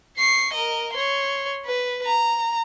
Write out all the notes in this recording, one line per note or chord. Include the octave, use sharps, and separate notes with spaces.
C#6 C7
A#4 D#5
C#5 C6
B4
A#5